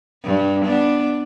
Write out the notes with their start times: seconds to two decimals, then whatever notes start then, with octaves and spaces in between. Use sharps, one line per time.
0.24 G2
0.65 B3 D4